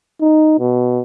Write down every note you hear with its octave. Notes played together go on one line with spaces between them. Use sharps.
D#4
B2